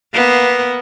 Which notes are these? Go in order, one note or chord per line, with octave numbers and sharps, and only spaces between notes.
A#3 B3